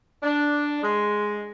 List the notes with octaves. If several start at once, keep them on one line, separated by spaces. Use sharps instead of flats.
D4
G#3